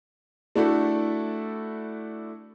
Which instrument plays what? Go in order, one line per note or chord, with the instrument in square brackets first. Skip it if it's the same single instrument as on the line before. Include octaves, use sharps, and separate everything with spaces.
[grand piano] A3 D4 E4 F#4 A4